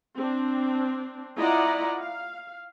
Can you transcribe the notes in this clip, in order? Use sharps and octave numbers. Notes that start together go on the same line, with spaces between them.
C4 D4
E4 F4 D5 D#5 F#5 A#5
F5